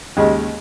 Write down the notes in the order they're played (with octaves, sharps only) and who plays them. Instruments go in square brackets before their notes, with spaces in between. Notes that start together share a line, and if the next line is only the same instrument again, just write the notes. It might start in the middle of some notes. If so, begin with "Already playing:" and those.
[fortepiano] D#2 C#3 G#3